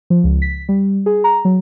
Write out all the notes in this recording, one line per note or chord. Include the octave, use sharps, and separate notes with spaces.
F3
C#2
B6
G3
G#4
A#5
F#3